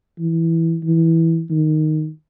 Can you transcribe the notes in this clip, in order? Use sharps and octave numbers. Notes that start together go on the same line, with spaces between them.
E3
E3
D#3